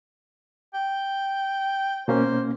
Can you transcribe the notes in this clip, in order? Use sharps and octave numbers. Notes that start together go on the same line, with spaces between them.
G5
B2 A#3 C#4 C5